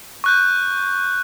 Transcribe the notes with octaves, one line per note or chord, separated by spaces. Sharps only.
C#6 F#6 G6